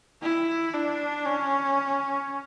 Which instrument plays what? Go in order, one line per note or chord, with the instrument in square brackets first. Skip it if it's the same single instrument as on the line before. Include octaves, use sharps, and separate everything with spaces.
[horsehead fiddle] E4
D4
C#4